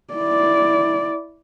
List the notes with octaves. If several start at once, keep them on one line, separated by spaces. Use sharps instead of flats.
E4 D5